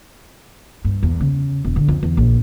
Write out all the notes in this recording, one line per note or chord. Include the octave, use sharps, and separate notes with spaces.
G2
E2
C#3
E1
D3
F2
E2
A#1